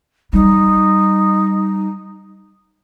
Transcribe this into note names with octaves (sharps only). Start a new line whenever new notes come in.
G3 D#4